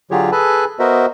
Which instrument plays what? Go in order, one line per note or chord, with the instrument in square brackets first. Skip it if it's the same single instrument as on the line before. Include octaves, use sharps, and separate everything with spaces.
[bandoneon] D3 F#3 F4 G4 G#4 C#5
G#4 A4 B4 G#5 A5 B5
B3 F#4 A#4 C5 D#5 E5